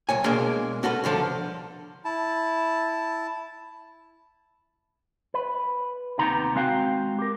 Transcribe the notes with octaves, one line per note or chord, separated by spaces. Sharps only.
C2 C#5 G#5
B2 G#3 A#3 D4 G#4
C#4 F#4 A4 B4
C2 D3 F3 A4
E4 A5
B4
D#2 C3 B3 D#4 A#5 C6
G#3 C4 F#4 F5 G5
G4 A#4